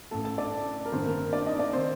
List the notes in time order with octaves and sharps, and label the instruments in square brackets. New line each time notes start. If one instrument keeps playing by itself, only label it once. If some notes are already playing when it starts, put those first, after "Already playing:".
[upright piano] A1 A2 A4 A5
A4 A5
D4 D5
A#4
A1 G2 D#3 C4 C5
A#3 A#4
D4 D5
D#4 D#5
D4 D5
C3 D#3 C4 C5